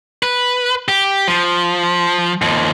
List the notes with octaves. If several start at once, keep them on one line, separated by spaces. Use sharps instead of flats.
B4
G4
F3
D#2 F3